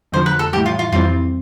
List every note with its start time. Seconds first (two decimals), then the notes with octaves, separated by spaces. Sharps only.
0.12 F2 D3 F3 C5
0.26 B4
0.39 A4
0.53 A2 E3 G3 G4
0.66 F4
0.79 F4
0.92 F2 E3 G3 C4 F4